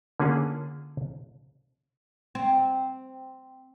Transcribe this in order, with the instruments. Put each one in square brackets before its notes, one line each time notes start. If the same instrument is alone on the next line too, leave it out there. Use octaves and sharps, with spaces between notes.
[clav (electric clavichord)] D3 A#3 C#4 F4 G#4
[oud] C4